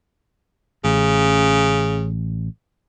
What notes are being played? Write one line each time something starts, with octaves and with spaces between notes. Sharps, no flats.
A1 C#3